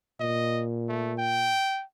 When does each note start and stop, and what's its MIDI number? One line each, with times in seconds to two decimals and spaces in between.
0.20 1.56 46
0.20 0.64 75
0.89 1.13 57
1.19 1.84 79